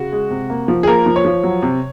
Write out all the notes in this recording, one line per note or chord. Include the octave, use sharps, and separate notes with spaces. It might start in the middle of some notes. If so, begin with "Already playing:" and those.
Already playing: C#3 F#4
G#3
C3
A#3
F3
G#4
A#3 A#4
F3
C#5
F3
F#3
C3